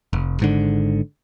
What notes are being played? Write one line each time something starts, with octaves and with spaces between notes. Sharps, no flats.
F1
G#1 G#2 D3